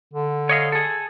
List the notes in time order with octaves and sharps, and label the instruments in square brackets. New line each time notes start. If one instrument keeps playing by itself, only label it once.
[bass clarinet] D3
[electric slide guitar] C#5 D#5 F5
G#4 A4